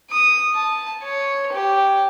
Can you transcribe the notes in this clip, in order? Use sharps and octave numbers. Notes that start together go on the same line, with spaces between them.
D#6
A5
C#5
G4